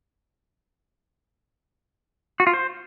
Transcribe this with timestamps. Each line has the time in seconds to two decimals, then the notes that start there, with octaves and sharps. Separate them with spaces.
2.40 F#4
2.47 F4
2.54 C5